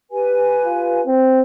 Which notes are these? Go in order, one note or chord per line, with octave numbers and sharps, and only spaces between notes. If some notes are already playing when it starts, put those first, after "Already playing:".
G4 B4 G#5
F4
C4